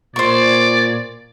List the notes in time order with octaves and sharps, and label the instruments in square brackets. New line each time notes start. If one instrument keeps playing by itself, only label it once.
[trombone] A#2 [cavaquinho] C5 C#6 [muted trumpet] D5